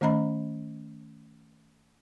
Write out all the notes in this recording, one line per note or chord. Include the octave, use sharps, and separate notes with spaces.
D#3 A3 C#4 D#5 A#5 B5